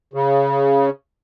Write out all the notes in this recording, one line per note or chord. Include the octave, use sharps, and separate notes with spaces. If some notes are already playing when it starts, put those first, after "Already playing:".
C#3